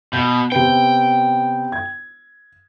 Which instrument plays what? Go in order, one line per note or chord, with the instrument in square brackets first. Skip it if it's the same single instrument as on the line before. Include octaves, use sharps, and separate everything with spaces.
[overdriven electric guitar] B2 [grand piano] G6
[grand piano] C3 B3 [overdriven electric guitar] G5
[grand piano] G#6